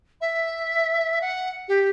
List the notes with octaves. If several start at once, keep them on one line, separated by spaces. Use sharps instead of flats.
E5
F#5
G4